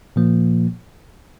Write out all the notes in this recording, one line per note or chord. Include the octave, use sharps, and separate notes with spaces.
A#2 F3 A#3